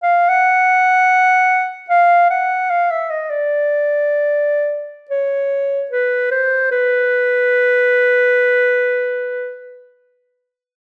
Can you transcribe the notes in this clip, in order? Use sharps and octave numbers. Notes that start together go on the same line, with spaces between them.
F5
F#5
F5
F#5
F5
E5
D#5
D5
C#5
B4
C5
B4